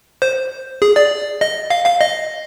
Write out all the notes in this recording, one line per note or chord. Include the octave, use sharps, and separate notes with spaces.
C5
G#4
D5
D#5
F5
F5
D#5